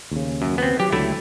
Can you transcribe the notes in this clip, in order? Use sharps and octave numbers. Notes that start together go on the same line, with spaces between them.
D#2 C#3
F#2
B3 C4
F#3 G4
C#2 D3 F#3 A3 E4